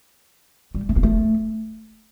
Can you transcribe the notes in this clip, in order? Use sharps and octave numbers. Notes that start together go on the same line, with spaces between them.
G3
A3
A#3
A3